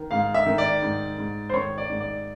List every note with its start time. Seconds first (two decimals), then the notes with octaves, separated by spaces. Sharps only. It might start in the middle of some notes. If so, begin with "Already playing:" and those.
Already playing: D#3
0.11 G#2 F5
0.34 E5
0.46 D#3
0.58 D5
0.82 G#2
1.18 G#2
1.49 C5
1.53 D#3 C#5
1.78 D5
1.89 G#2
2.01 D5